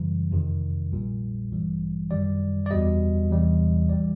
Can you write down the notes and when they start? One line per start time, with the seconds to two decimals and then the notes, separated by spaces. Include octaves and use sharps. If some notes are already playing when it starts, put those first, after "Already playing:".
Already playing: F#2 C#3 E3 G3
0.31 F2 C3 D#3
0.91 A#1 A#2 G3
1.51 A1 G2 E3 G3
2.11 F#2 D#3 G3 D5
2.66 D5
2.70 E2 B2 G3 D#5
3.30 E2 C3 E3 G3
3.89 A#1 E3 G3 D5